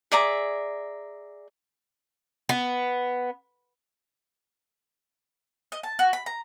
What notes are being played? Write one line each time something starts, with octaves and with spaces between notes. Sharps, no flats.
G#4 D5 E5 A#5
B3
D#5
A5
F#4
B5
A#5